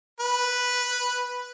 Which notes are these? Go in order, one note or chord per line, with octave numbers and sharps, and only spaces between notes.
B4